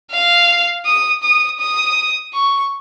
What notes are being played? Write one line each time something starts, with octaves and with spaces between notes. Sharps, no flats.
F5
D#6
D#6
D#6
C#6